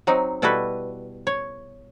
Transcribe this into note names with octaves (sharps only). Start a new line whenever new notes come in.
F#3 C4 D#4
B2 G3 E4 F#4 A4 B4
C#5